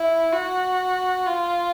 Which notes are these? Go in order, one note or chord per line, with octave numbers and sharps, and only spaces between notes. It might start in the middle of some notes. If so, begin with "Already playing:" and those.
Already playing: E4
F#4
F4